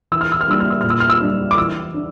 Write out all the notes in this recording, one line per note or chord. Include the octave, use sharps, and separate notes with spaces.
E3 E6
F6
E6
F6
G3 A#3 D4 E6
F6
E6
A#2 F6
E6
F6
E6
G3 D4
D6
E3 E6
D4